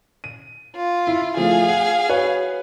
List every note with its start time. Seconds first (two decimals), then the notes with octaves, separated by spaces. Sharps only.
0.24 D#7
0.77 F4
1.07 E4
1.37 F3 A3 G#4 F5
1.69 F#5
2.09 F#4 B4 C#5